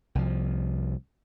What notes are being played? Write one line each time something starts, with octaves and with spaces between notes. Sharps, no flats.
C2 F3